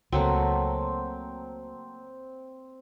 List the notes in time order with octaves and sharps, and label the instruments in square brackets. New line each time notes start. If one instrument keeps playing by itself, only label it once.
[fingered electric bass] C#2 [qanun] F#3 A3 A#3 [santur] C4